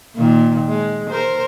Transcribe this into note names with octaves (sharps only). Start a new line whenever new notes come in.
A#2 D#3
G#3
A#4 C5